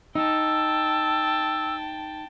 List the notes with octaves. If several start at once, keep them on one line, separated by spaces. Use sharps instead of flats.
D#4 G5 A5 E6